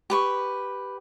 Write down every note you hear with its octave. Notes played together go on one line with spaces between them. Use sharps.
G4 B4 C#6